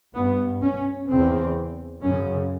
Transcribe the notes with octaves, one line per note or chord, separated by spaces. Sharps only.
G2 B3
C#4
E2 C#3 C4
F#2 C#3 C#4